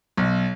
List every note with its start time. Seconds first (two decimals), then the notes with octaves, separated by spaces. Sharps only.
0.17 B1